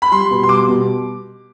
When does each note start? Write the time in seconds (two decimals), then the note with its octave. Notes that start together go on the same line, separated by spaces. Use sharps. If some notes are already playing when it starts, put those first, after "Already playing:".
0.02 B5
0.12 G3 C6
0.31 B2
0.43 C6
0.49 G3 D6
0.68 B2